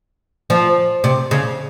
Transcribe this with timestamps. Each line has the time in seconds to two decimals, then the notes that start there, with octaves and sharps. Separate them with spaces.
0.50 F3
1.04 C3
1.31 C#3